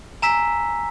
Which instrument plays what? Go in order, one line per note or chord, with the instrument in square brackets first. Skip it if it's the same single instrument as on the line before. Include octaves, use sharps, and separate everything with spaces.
[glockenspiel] G#5 A#5 E6 B6